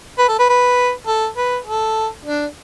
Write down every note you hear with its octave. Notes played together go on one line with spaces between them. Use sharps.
B4
A4
B4
B4
A4
B4
A4
D4